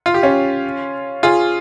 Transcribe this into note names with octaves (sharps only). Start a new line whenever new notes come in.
F4
G4
C#4 F4
F4 G#4